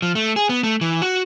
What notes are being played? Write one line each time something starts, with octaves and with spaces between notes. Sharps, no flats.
F3
A3
G#4
B3
A3
E3
F#4